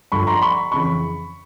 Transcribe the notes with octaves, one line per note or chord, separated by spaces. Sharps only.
G2 D3 F3 B5 C#6
A#5 C6
B5 C#6
F2 C#3 E3 B5 C#6